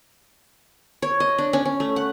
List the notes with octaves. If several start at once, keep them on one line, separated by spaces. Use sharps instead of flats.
C#5
D#5
D4
C#4
C#4
A3
F#5